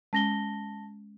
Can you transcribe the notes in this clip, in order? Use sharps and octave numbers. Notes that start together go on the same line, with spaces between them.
G#3 C#4 A5 A#6 G7